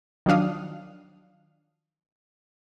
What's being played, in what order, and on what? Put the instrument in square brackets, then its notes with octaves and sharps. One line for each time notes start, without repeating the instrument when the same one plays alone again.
[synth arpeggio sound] D#3 F3 F#3 D4 F5 D#6